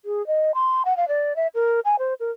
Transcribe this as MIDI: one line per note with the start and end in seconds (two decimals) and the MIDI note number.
0.05 0.25 68
0.27 0.51 75
0.54 0.82 84
0.85 0.96 78
0.97 1.08 77
1.08 1.36 74
1.36 1.47 76
1.55 1.80 70
1.85 1.96 80
1.99 2.14 72
2.20 2.30 70